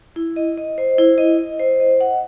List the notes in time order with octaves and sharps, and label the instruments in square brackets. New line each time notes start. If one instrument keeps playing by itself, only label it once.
[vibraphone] E4
D#5
D#5
C5
E4
D#5
D#5
C5
D#5
F#5